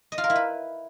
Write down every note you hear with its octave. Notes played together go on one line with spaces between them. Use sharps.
D#5
F4
A#4
E4
B4